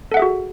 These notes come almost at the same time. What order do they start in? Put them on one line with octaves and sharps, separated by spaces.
A4 F#5 E5 G#4 F#4